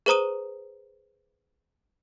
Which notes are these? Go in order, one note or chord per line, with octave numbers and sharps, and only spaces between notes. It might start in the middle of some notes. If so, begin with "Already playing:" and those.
G#4 B4 C5 A#5 D#6 D#7